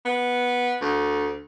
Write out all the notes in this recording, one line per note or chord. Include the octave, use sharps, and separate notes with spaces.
B3
D2